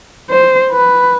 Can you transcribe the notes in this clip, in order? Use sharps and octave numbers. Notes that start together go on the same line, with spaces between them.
C5
B4